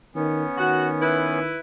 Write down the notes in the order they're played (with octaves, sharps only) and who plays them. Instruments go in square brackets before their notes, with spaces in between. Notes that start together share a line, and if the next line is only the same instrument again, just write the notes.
[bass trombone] D#3 [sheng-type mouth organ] B3 C#4
[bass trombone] D#3 [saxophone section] F#4
[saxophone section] E4 B4